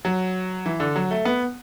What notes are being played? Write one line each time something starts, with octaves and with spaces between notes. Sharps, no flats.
F#3
E3
D3
F#3
A3
B3